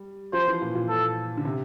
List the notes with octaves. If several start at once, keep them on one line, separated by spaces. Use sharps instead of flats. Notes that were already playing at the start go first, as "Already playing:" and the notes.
Already playing: G3
F3 C5
E3
A#2
A#2
A4
D3
C3